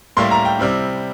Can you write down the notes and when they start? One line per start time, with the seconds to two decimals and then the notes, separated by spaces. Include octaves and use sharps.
0.17 A2 G3 A#3 E4 C6
0.31 A#5
0.45 G5
0.59 C3 G3 C4 E4